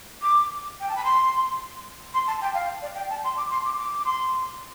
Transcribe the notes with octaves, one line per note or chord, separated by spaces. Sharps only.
D6
G5
A5
B5
C6
C6
A5
G5
F5
D5
G5
A5
C6
D6
C6
D6
D6
D6
C6